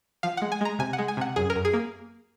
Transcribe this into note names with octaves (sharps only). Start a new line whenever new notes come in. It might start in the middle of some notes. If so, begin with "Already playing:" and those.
F3 F5
G#3 F#5
G#5
G#3 A#5
C3 G#5
F#5
G#3
G#5
C3 F#5
F#2 G#4
A#4
F#2
G#4
A#3